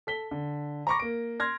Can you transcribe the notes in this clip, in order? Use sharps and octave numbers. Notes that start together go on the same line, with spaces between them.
A4 B6 G7
D3
A#5 B5 C#6 D6 A#6
A#3 D7
C6 F6 G#6 A#6